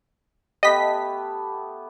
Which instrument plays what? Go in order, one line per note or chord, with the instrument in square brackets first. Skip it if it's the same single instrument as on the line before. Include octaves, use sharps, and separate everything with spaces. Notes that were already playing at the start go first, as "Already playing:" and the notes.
[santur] A3 B3 G4 [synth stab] D#5 B6